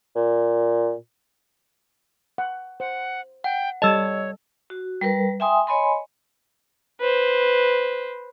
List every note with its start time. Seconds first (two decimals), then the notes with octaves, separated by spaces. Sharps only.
0.15 A#2
2.38 F#5
2.80 C5 F#5
3.44 F#5 G5
3.82 G3 A4 C#5 D#5 A5 E6
4.70 F#4
5.01 G3 A#4 B4
5.40 E5 G5 G#5 C6 D#6
5.67 C#5 D#5 G#5 B5 C6
7.00 B4 C5